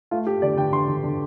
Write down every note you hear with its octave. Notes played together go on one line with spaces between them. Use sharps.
A3 F4
A3 G4
D3 D5
D3 G5
D3 C6
D3
D3